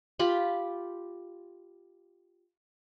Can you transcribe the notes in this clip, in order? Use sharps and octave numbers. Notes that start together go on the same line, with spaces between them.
F4 G4 B5